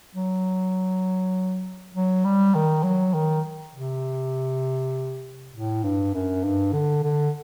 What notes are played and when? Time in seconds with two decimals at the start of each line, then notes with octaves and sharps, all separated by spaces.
0.15 F#3
1.95 F#3
2.25 G3
2.55 D#3
2.84 F#3
3.14 D#3
3.75 C3
5.53 A2
5.83 G2
6.14 F#2
6.44 G2
6.73 D3
7.03 D3